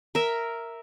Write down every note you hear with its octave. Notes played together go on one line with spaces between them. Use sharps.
A#4 E5